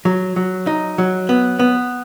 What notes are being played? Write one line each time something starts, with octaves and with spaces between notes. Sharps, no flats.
F#3
F#3
D#4
F#3
B3
B3